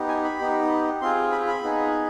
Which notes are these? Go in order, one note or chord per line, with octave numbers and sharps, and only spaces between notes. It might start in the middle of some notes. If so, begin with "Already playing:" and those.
Already playing: B3 D#4 G4
G#5
B5
B3 D#4 G4
C4 F4 G#4 C6
B5
B5
B3 D#4 G#4